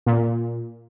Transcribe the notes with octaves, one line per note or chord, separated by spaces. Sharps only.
A#2